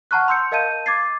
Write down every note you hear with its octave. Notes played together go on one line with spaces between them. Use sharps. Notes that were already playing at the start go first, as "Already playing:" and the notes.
F#5 A5 A#5 C#6 F6 F#6
C6 E6 G6 C#7
A#4 D#5 F5 A5 G6 D#7
D6 G#6 A6 C7